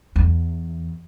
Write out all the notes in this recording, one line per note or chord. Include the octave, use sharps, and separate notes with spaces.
E2